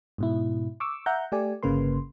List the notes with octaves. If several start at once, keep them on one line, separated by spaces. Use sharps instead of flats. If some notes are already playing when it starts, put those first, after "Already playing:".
G#2 B2 E4
C#6 D6 E6
E5 F#5 A#5 G6
A3 G4 D5 G#5
G1 C#3 A#3 B4 C6